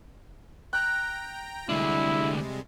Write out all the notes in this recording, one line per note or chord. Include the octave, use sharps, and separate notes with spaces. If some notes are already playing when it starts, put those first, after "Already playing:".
G5 A#5 F#6
D2 C3 G3 G#3 D4 E4